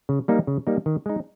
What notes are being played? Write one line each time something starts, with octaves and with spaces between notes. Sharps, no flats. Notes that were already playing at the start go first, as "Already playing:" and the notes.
C#3
G3 A#3 D#4
C#3
G3 A#3 D#4
D#3
G#3 D#4